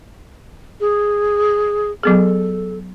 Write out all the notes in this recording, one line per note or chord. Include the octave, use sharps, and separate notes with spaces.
G#4
F#3 B3 G#4 A4